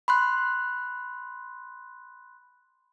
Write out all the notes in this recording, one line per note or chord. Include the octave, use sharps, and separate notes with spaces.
B5 C6 F#6